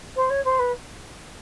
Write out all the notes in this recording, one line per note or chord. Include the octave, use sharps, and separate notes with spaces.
C5
C#5
C5
B4